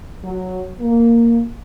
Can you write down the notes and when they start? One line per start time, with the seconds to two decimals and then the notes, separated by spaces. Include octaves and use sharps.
0.24 F#3
0.80 A#3